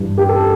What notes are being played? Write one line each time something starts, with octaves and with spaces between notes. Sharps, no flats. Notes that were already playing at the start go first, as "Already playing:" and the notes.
Already playing: G2 E3
G4
A4